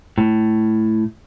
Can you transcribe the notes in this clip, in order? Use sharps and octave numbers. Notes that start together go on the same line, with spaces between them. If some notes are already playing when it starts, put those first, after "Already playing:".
A2